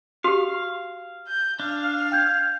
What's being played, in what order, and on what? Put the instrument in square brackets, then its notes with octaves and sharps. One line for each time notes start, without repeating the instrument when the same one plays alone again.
[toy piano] F#4 G4 [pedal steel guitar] F5
[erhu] G6
[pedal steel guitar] D4 [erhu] F5
[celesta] G5 G6 G#6